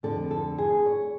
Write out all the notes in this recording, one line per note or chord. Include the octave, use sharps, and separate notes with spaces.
F2 D3 A4
A4
G#4
C#5